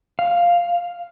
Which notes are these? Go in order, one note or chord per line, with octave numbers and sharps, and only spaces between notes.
F5